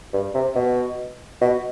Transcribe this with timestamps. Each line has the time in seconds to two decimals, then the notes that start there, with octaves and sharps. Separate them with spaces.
0.13 G2
0.34 C3
0.55 B2
1.41 B2